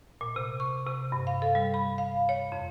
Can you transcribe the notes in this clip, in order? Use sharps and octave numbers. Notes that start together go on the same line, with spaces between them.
A#2
C3
C#6
C3
G2
F5
A4
G3
B5
F5
C#5
F2